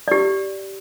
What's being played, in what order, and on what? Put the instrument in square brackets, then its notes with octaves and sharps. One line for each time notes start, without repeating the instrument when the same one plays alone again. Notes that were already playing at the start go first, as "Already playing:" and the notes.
[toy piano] G4 D5